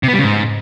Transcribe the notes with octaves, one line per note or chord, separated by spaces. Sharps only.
C3
B3
G3
C#3
G#2